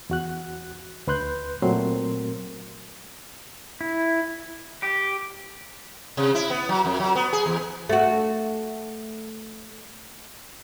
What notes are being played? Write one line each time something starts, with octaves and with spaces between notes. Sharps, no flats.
E2 F#4 F#6
D2 B4 C6 F#6 G6
A#2 F#3 A3 C4 A#4 C6
E4
G4
C3
E4
B3
F#3
F2
F#3
B3
G#4
E2
A3 F#4